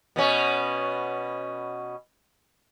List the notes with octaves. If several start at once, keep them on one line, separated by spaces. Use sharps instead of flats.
B2 B3 C#4